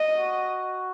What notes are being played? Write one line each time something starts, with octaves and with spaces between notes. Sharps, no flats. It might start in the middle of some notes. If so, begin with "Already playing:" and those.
Already playing: D#5
F#4